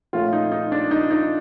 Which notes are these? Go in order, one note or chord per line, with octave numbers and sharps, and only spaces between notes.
A#2 F3 A3 C#4 F4
D#4
D#4
D4
D#4
D#4